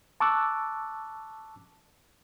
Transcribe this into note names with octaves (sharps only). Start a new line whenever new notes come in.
A5 C#6 D6 E6 F#6